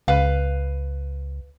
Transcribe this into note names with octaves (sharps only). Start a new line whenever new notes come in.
C#2 B4 F5